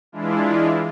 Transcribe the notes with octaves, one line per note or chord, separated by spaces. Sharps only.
E3 G#3 D4 E4 F4